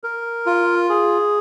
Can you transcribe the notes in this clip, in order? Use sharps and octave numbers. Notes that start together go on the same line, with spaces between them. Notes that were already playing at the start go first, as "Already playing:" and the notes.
A#4
F4
G#4